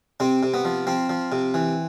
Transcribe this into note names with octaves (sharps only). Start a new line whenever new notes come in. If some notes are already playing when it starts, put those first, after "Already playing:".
C3 C4
C3
B3
F3
F3 C4
F3
C3
E3